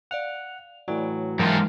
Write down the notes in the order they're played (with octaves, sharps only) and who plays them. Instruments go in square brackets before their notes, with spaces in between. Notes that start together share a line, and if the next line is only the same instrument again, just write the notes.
[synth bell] D5 F5 F7 [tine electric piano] F#5
[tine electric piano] A2 E3 F#3 [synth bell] D5
[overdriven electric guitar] G#2 F4 [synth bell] E3 F#3 A#4 [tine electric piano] G5 A5 A#5